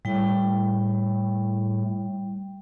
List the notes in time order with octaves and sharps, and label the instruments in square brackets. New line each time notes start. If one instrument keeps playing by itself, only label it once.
[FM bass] A2 [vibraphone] G3 G5